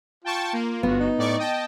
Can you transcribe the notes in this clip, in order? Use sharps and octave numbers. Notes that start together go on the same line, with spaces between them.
F4 G5 A5 C#6
A#3
G1 B3 F#4
D#4
A2 D5 C#6
D#5 G5 A5